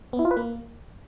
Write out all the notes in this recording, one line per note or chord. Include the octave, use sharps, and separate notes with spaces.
B3
E4
F4
B4
A#3